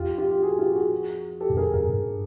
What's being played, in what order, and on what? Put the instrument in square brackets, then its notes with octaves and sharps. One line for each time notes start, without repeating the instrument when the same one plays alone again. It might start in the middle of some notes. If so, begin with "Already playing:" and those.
Already playing: [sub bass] F2 [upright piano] F4 G4
[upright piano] F4 G4
G4
F#4 G#4
F4 G4
F#4 G#4
G4 A4
[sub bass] F#2
[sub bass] F2 [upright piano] G#4 A#4
[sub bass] F#2 [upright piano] G#4 A#4
[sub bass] G2